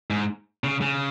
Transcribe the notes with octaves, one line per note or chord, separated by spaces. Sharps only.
G#2
C#3
C#3